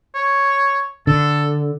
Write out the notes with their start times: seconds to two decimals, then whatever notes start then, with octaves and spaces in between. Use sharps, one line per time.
0.15 C#5
1.07 D3 A4